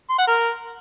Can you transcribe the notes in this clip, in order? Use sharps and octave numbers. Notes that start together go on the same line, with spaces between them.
C6
F#5
A#4